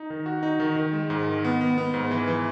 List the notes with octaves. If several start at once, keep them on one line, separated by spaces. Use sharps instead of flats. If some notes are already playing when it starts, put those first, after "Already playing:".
Already playing: D#4
D#3
F#4
D#4
D#3
D#3
G#3
G#2
D#3
B3
B3
B3
G#2
E3
E3